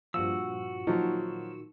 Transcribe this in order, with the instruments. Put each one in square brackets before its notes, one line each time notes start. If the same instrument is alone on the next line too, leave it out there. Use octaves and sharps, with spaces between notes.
[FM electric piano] G2 A#2 F3 [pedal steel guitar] F#4 E6
[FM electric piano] A#2 D#3 [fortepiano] F3 F#3